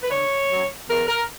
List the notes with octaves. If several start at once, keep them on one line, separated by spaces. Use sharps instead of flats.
B4
D3 C#5
F#3 C#4
E2 A#4
A#4